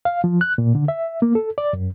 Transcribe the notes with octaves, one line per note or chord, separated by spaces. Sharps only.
F5
F3
F#6
A#2
D3
E5
A#3
A4
D5
F#2